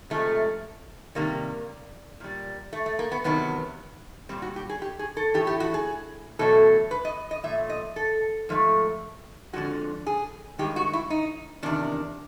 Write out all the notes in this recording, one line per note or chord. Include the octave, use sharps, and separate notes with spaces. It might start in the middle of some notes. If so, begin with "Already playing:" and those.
C3 F3 G#3 A3
C3 D#3 G3 A#3
A#2 G3
A3
A3
A#3
B3
E2 C3 D#3 F#3 B3
A#2 G3 C4
F#4
G4
G#4
G4
G#4
A4
A2 E3 A3 G4
G4
F#4
G#4
E2 B2 F#3 A3 A4
B4
D#5
D#5
A#2 F3 A3 E5
D#5
A4
G#2 F3 A3
F2 D3 F3 G#3 F#4
G#4
G2 D#3 G#3 G4
F#4
E4
D#4
E2 C3 D#3 D4